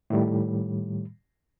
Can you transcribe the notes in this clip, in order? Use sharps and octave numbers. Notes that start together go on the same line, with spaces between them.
A2 D#3 G3